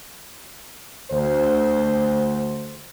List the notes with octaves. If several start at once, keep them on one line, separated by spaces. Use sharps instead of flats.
D2 C5